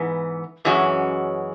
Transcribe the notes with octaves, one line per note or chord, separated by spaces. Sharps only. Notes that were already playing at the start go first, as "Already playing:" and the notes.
Already playing: G#2 E3 B3
F#2 E3 G#3 C#4 F#4